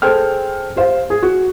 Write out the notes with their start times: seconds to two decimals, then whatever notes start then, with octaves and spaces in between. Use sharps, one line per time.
0.02 G#4 A4 C5 G5 F6
0.76 G4 C5 F5
1.10 G#4
1.23 F#4